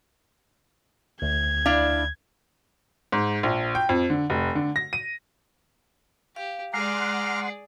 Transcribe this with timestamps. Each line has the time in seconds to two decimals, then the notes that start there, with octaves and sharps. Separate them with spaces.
1.22 D2 G#6
1.66 D4 E4 F5
3.12 G#2
3.43 A#1
3.75 G5
3.89 F2
4.10 D3
4.30 F1
4.55 D3
4.76 A#6
4.93 D#7
6.36 G4 F5
6.74 G#3 G#4 D5 F#5 A#5 C6 D6 F6